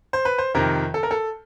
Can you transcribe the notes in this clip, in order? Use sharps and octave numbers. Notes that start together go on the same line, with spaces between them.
C5
B4
C5
F2 C3 D#3 A#4
A4
A#4
A4